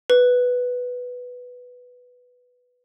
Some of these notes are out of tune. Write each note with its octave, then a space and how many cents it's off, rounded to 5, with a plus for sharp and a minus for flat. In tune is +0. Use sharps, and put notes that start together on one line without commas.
B4 +0